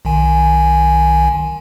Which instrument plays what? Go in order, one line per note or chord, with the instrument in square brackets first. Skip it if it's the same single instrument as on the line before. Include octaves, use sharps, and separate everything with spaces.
[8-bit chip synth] B1 D#3 G#5